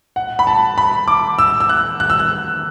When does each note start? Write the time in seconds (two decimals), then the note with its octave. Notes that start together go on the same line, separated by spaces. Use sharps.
0.16 F#5
0.39 B5
0.47 A5
0.78 B5
1.08 D6
1.39 E6
1.60 E6
1.69 F#6
2.00 F#6
2.10 E6
2.19 F#6